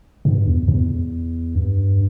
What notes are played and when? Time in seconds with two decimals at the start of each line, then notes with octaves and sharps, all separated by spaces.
0.25 G2
0.47 E2
0.68 E2
1.55 G2